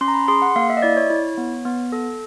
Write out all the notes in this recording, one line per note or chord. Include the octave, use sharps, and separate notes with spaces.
C#4 C6
A#5
B5
G#4 C6
F#5
A#3 F5
E5
D#5
E4 D5
C#5
E4
B3
B3
A4